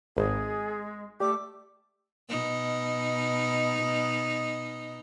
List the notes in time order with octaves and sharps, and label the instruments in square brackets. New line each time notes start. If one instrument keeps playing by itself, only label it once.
[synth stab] G#1 [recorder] G#3 [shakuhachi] G#4
[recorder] A3 [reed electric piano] G4 D5 [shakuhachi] D6
[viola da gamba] B2 D#4